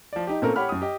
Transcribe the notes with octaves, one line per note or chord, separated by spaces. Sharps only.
F3 D5
D#4 G4
A#2 A3 C4 C#4 A4 A#4
G4 C#5 F#5 B5 F6
F#2 D#6
G4 D#5